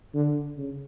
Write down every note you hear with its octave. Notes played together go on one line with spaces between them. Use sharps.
D3
C#3